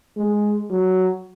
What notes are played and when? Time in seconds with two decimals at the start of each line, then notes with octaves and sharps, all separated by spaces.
0.17 G#3
0.70 F#3